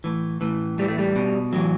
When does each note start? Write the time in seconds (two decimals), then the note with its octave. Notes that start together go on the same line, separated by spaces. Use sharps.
0.04 A2 E3
0.41 A2 E3
0.78 A2 E3 G3
0.88 A3
0.98 G3
1.16 B2
1.53 A2 E3 F#3